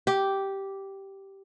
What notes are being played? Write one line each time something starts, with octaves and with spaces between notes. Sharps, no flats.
G4